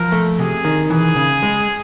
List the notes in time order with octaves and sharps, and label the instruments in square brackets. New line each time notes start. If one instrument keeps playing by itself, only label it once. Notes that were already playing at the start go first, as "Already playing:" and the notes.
Already playing: [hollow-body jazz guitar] F3 [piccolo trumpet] A#4
[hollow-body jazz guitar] A3
[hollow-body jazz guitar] C3 [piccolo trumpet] G#4
[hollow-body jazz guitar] D#3
[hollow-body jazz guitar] E3 [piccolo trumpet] G#4
[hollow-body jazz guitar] C#3
G#3